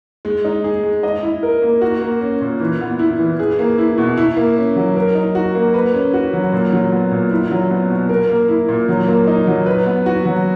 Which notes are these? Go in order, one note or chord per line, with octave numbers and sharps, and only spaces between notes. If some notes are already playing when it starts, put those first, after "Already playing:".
G#3
D#4
G#4
G#3
D#5
E4
A#4
A#3
F#4
A#3
C#4
A#2
E3
B3
E4
E3
G#4
A#3
E4
B2
E4
A#3
C#4
F#3
A#4
D#4
F#4
A#3
B4
C#4
F#4
F#3
A#2
F#3
B3
A#2
E4
F#3
B3
B2
A#4
A#3
E4
A#2
F#3
A#3
D#4
F#3
B4
B3
F#4
F#3